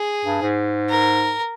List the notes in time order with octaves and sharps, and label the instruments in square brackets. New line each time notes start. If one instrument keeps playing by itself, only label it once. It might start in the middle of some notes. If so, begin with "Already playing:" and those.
Already playing: [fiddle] G#4
[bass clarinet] G2
G#2
[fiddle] A#4